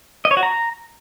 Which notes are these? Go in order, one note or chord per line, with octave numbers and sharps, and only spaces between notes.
D#5
C#5
F#4
A#5